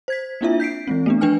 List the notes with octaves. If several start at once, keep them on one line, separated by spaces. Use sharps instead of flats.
C5 G#6 B6
A#3 C4 D4 E4 F4 E5
G6 B6 C7 D7
E3 G#3 C4
A3 B3 D4
F3 D4 B4 G5 G#5 F6